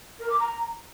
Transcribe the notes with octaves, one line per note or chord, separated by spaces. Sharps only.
A#4
D6
A#5